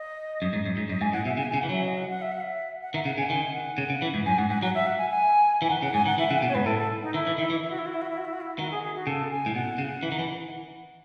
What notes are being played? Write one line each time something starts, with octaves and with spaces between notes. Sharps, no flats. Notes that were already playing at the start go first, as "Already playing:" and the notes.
Already playing: D#5
F#2
G#2
F#2
G#2
F#2 D#5
G#2 G#5
A2 F#5
B2 E5
C#3 G#5
G#5
C#3
E3 F#5
F#3 E5
D#5
F#5
F#5
E5
F#5
E5
F#5
D#3 E5
C#3 F#5
C#3 G#5
D#3 G#5
F#5
C#3
C#3
E3
G#2
F#2 G#5
G#2 F#5
G#2 F#5
F#3 F#5
E5
F#5
G#5
G#5
E3 G#5
D#3 F#5
C#3 F#5
G#2 G#5
D#3 F#5
E3 E5
C#3 F#5
G#5
B2 F#5
C#5
G#2 B4
A2 A4
A4
D#4
D#3 E4
E3
D#3 E4
E3
E4
F#4
E4
F#4
E4
F#4
E4
F#4
E4
F#4
E4
D#3 F#4
G#4
G#4
F#4
C#3 A4
G#5
A2
B2 F#5
C#3
E3
D#3
E3